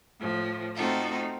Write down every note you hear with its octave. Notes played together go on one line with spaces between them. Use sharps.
A2 F3
A3 C4 D#4 F4 F#4 A4